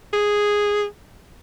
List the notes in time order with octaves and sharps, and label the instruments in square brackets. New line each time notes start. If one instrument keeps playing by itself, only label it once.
[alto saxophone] G#4